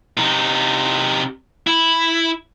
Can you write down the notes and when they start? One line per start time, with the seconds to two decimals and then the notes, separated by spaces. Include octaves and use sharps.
0.17 C3 D#4
1.67 E4